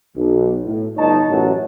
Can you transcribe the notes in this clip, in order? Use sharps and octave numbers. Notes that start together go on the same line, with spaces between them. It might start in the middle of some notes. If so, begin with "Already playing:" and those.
B1
A2
G1 D#4 C#5 A5
A1 F#2 F#3